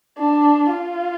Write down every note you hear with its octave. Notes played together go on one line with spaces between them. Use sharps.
D4
F4